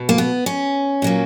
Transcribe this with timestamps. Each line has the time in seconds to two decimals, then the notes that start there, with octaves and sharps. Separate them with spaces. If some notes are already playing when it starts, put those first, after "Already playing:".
Already playing: B2
0.09 A#3
0.18 B3
0.46 C#4
1.02 A#2 F#3 A#3